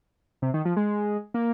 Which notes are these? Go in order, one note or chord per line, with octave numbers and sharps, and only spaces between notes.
C3
D#3
F3
G#3
A#3